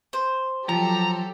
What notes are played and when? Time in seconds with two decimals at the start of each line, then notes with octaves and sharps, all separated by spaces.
0.13 C5
0.69 F3 F#3 G4 A4 A#5